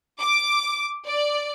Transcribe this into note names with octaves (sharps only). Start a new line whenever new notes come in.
D6
D5